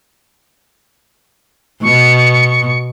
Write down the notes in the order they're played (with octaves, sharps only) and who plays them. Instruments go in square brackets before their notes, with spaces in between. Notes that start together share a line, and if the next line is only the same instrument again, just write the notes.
[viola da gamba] B2 [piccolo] C#6